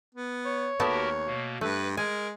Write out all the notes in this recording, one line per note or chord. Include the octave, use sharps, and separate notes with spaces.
B3
C#5
D#2 A3 B3 F#4 G4 A#4 A5
B2 A#3
G2 A3 B4 F#6
G#3 A#4 G#5